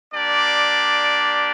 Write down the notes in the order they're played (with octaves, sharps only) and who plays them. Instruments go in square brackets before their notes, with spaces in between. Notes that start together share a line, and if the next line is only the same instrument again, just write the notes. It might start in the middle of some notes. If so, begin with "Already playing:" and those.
[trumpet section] A#3 D4 G4 D5